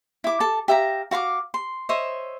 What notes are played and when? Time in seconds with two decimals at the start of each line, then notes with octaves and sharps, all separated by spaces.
0.24 E4 D6
0.40 A4 A5
0.68 G4 E5 F5 A#5
1.11 F#4 F5 B5 D6
1.54 C6
1.89 C5 C#5 D#5 E5